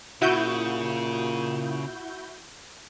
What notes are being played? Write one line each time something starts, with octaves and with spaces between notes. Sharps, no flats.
A#2 C#3 E4 F#4 G6